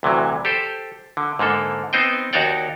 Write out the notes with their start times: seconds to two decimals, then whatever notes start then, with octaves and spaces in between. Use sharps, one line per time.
0.03 D2 C3 E3 F#3
0.45 G4 A4 C5
1.17 D3
1.39 G#2 D3 A#3 A4
1.93 B3 C4 D#4 C5 D#5 G5
2.33 D#2 D#4 F#4 C#5 D5 G5